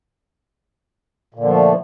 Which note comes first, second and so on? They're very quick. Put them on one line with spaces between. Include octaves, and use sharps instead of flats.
A#2 D3 F3 A3